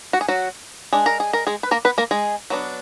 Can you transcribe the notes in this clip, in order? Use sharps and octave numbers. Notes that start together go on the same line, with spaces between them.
F#4
G#4
F#3 F#4
G#3 D4 G#4
A#4
G#4
A#4
G#3 G#4
B4
A#3 A#4
B3 B4
A#3 A#4
G#3 G#4
F#3 B3 D4